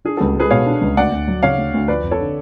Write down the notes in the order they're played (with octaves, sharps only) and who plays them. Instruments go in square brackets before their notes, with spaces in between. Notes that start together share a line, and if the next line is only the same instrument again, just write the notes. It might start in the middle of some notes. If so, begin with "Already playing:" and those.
[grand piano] D4 [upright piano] G#4
[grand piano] C#2 [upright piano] F#4 A4
[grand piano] G#3 [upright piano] G#4 B4
[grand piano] B2 [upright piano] C#5 F5
[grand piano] D4
C#2
[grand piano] D2 [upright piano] D5 F#5
[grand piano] D2
F#3
[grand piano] C#3 [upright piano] C#5 F5
[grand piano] D2
D2
[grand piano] F3 [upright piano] B4 D5
[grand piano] F1
[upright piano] A4 C#5
[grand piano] D3